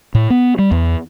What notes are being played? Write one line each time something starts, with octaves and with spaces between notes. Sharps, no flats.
A2
B3
G3
E2